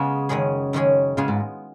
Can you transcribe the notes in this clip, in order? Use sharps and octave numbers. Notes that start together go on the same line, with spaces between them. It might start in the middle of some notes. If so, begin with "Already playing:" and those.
Already playing: C#3 G#3 B3 F4 G#4
F#2 D#3 G#3 C#4 G#4
F#2 D#3 G#3 C#4 G#4
C#3 G#3 B3 F4 G#4
G#2